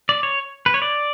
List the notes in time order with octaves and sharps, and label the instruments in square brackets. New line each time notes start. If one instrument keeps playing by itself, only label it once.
[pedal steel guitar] D5
C#5
B4
C#5
D5